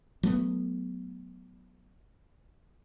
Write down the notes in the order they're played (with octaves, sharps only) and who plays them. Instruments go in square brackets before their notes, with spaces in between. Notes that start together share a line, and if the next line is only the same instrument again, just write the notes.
[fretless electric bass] F#3 A3 B3